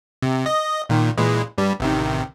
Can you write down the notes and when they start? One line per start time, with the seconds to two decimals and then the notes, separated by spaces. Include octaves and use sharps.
0.23 C3
0.46 D#5
0.89 A#2 D#3
1.18 A#2 E3 G#3
1.58 G2 G3
1.80 A1 C3 D#3